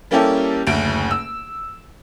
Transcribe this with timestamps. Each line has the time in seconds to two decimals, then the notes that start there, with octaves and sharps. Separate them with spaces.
0.11 G3 A#3 C#4 E4 G4 A4
0.67 F#1 D2 D7
1.11 E6